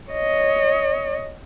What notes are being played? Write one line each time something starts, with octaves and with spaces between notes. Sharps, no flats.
C#5 D#5